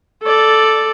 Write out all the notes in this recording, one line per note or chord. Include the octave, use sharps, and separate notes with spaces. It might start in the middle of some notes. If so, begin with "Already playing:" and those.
A4 D5